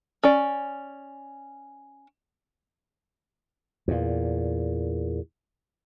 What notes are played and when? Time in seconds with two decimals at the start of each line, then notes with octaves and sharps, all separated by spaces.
0.24 C#4 D5
3.88 E2 A#2